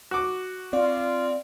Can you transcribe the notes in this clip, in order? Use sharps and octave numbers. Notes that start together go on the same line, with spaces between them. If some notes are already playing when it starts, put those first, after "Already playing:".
F#4 D6
C4 F4 D5